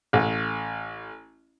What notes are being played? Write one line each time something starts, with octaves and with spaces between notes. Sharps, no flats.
A1